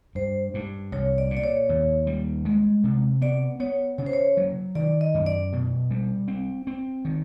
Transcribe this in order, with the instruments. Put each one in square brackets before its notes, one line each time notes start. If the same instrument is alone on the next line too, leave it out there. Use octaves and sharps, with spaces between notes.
[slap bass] G2 [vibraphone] C5
[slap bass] G2
[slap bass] C2 [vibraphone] C#5
[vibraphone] D5
[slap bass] A#2
[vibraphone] D5
C#5
[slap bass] D#2
G3
G#3
C3
[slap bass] B3 [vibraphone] D5
[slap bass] B3 [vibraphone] C#5
[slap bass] C#3 [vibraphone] C#5
[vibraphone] C5
C#5
[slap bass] F#3
[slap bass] D#3 [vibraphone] D5
[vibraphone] D#5
[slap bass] F#2
[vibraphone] D5
[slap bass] B2
G3
C4
C4
D#3